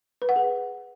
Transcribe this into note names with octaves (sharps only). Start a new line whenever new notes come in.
B4
F#5
G#4